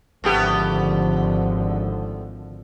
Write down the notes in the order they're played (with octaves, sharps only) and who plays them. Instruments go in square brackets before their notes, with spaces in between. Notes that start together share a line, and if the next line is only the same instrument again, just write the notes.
[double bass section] G#1 D3 F3 [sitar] A3 B3 G4